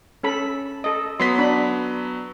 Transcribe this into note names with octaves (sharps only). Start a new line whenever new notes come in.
C#4 A4 B5
A4 D#5
F#3 B3 C6 B6
D4 B5